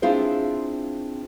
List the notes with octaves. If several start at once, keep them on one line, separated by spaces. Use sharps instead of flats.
C4 D4 E4 F4 G#4 C5